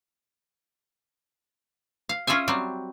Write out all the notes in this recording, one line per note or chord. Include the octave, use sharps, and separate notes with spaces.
F5
C#4 F4 G#4 E5 G#5
F#3 G3 C4